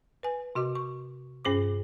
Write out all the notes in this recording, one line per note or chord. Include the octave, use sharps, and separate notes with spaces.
B4 G#5
C3 F#4 D#5 D6
C#6
G2 C#4 G#4 C5 D6